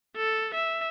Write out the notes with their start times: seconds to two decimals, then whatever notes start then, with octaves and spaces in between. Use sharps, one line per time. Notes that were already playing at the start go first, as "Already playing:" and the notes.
0.17 A4
0.54 E5